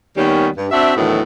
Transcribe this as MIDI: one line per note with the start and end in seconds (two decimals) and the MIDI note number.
0.17 0.48 39
0.17 0.48 51
0.17 0.48 55
0.17 0.48 59
0.17 0.48 61
0.57 0.67 43
0.71 0.95 60
0.71 0.95 62
0.71 0.95 66
0.71 0.95 76
0.97 1.20 38
0.97 1.20 45
0.97 1.20 51
0.97 1.20 52
0.97 1.20 54
0.97 1.20 59